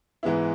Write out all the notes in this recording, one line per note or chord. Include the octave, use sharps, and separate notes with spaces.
G#2 E3 G#3 B3 E4